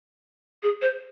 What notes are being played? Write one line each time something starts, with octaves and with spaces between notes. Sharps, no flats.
G#4
C5